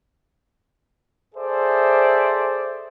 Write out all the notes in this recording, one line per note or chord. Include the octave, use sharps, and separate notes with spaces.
G#4 A4 C5 D5 E5